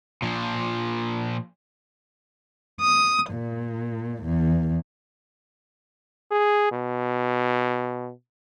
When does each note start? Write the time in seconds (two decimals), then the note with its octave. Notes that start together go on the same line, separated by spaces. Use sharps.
0.22 A#2 F3
2.81 D#6
3.31 A#2
4.24 E2
6.31 G#4
6.72 B2